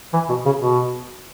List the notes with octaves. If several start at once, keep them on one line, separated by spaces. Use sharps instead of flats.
E3
B2
C#3
B2